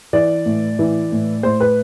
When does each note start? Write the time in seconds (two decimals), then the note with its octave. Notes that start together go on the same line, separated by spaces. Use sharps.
0.13 E3 D5
0.46 A2
0.79 E3
1.12 A2
1.43 A2 C5
1.60 B4